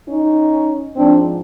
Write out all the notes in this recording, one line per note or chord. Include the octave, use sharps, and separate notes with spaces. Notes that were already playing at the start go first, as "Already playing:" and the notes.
C#4 D#4
G#2 F3 C4 D4